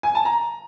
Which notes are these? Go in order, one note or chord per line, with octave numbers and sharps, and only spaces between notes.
G#5
A5
A#5